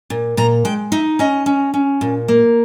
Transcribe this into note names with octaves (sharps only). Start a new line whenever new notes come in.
A#2
A#2 A#5
G#3 G5
D#4 E5
C#4 D#5
C#4
C#4
A#2
A#3